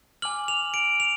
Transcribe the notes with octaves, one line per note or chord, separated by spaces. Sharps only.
G#5 D6 F6 F#7
F7
D7
F7